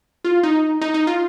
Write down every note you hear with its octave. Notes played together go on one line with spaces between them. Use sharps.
F4
D#4
D#4
D#4
F4